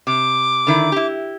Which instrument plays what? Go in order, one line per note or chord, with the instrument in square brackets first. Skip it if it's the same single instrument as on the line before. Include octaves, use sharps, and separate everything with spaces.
[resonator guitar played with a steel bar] C3 [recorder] D6
[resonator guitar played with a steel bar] D3 D#3 E4
E4 G4